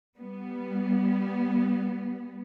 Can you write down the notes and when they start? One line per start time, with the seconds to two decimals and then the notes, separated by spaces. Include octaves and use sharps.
0.17 G3 B3